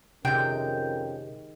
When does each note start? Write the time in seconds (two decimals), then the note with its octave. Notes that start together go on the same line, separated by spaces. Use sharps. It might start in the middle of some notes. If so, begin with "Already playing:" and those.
0.25 F2 C3 D#3 G#3 C#4 A#4 G5